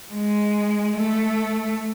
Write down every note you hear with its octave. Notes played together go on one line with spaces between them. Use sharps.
G#3
A3